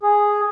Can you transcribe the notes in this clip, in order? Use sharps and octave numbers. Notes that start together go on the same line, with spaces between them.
G#4